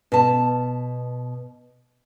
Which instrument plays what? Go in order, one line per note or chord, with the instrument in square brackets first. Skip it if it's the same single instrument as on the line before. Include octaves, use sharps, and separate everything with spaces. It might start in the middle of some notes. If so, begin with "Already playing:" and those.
[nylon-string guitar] B2 A5